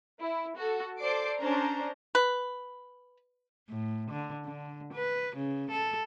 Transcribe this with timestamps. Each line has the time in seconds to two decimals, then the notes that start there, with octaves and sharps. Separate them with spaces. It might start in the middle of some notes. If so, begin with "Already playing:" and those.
0.21 E4
0.56 F#4 A4
0.98 A4 C5 D5 D6 C7 D7
1.39 C#4 D4 C5 A#5
2.15 B4
3.69 A2
4.10 D3
4.45 D3
4.93 B4
5.36 C#3
5.71 A4